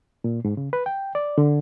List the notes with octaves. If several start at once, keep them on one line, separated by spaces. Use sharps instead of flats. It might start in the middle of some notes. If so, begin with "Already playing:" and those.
A#2
G#2
C#3
B4
G5
D5
D3